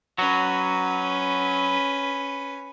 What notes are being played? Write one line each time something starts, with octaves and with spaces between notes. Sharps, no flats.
F#3 C#4 F#4 B4